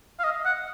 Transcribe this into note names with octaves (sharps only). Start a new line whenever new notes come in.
F5
D#5
F#5